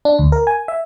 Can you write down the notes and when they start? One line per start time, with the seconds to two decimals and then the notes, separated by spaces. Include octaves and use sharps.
0.05 D4
0.19 D2
0.32 A#4
0.47 G#5
0.68 E5